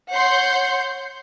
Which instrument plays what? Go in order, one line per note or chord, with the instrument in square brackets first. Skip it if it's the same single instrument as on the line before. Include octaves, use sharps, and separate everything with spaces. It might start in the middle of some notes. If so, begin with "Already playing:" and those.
[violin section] C#5 F#5 C6 G6